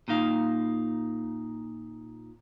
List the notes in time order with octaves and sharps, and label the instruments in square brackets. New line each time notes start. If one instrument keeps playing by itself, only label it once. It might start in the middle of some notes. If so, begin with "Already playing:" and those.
[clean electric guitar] A#2 A#3 D#4 F5